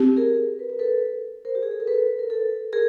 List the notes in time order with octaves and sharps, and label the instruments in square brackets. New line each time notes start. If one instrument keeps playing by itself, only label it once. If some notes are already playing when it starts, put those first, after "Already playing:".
Already playing: [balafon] C4 G4
[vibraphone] G#4 A#4
B4
A#4
A4 B4
A#4 C5
G4
G#4
A4
A#4
A4 B4
A#4
A4 B4
G#4 A#4